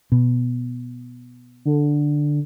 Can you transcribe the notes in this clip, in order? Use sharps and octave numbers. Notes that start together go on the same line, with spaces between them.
B2
D3